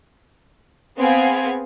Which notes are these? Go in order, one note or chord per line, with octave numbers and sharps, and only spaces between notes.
B3 C4 G#4 F5 G#6